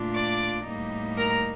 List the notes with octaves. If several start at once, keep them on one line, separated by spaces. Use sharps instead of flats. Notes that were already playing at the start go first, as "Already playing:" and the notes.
Already playing: A#2 A3 D4 F4
D5 D6
A2 G3 A#3 D#4
A#4 A#5